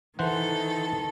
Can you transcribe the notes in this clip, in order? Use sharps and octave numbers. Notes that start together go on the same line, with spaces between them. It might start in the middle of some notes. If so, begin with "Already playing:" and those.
D#3 E3 A4 C5 F#5